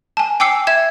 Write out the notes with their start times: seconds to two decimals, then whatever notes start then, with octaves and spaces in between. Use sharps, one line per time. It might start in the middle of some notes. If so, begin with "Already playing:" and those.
0.17 G#5 A5
0.40 G5 G#5 D6 E6 C7 C#7
0.67 E5 G#6 E7